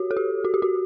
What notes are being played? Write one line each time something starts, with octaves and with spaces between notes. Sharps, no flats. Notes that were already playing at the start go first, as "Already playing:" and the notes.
Already playing: F#4 G4 C#5
A4
G4
F#4
G4
F#4